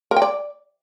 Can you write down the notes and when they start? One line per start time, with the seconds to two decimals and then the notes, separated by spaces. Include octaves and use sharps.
0.11 A#4
0.16 G5
0.22 D5